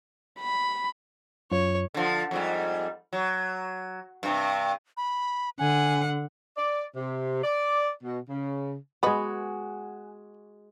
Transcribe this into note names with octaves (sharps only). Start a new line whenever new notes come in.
B5
F#2 F4 C#5
D3 F3
F2 G#2 G3
F#3
G2 C3
B5
D3 F#5 G#5
D5
C3
D5
B2
C#3
G#3 B3 F#4 B4 D#5 F#5 G#5